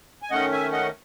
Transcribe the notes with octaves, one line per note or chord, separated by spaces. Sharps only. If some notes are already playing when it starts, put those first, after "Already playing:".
G#5
D#3 A3 C#4 D#5 F#5
E5 G#5
D#5 F#5